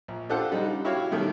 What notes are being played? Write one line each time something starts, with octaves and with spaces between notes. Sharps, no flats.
A#1
D4 F4 G4 A4 C5 F#5
C#3 G3 D#4
E4 F#4 G4 C#5 F5
B2 D#3 G3 A3